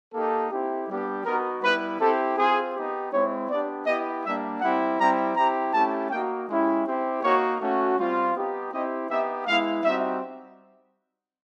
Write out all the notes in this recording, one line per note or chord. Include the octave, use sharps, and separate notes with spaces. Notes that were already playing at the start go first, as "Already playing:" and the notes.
A#3 D#4 G4 A4
C4 E4 G4
G3 B3 D4 G4
B3 D#4 F#4 A#4
G3 B3 E4 B4
C4 E4 G4 A4
C4 F4 G#4
B3 D#4 G4
G#3 C4 E4 C#5
B3 D4 G4 D5
B3 E4 G4 D#5
G3 A#3 D4 E5
G3 C4 E4 G4 F#5
G3 C4 E4 G4 A#5
C4 E4 G4 A#5
A3 C#4 E4 G4 A5
A#3 D#4 F#4 G5
G#3 C#4 E4 G4
C4 E4 G4
A#3 D#4 F#4 C#5
A3 C#4 F#4
G3 C4 F4
B3 D#4 G4
C4 E4 G4 D#5
B3 D#4 G4 E5
G#3 B3 E4 F5
G3 C4 D#4 F#4 E5